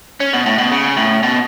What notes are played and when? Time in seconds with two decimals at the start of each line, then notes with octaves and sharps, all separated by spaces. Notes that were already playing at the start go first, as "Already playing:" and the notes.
0.20 C#4
0.33 B2
0.46 A2
0.58 B2
0.72 C#3
0.97 A2
1.23 B2